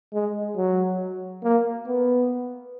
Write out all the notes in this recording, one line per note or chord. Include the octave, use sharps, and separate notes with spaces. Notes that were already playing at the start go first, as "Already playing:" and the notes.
G#3
F#3
A#3
B3